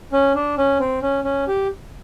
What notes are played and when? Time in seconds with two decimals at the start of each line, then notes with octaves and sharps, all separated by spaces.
0.13 C#4
0.35 D4
0.58 C#4
0.79 C4
1.02 C#4
1.24 C#4
1.47 G4